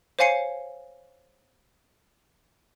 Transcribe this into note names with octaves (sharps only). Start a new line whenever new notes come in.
C5 C#5 F5 G#5 C7 C#7